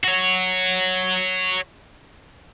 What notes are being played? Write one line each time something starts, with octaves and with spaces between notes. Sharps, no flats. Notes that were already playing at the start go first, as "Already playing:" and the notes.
F#4 C#5